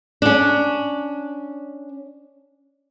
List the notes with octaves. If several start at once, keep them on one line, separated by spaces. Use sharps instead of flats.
C#4 D4